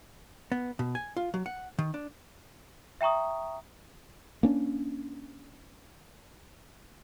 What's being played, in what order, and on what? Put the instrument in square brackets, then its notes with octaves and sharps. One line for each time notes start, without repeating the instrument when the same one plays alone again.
[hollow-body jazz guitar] B3
B2
G#5
F4
F#3
F#5
D#3
D4
[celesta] E5 G5 A#5 C#6 D#6
[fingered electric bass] A#3 C#4 D4